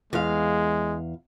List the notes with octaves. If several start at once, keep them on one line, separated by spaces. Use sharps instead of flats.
E2 G#3 F5